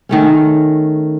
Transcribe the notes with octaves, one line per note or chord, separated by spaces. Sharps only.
D#3 A3 C#4